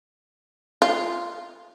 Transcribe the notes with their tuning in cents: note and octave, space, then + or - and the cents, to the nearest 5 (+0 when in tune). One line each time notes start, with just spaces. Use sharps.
F4 -10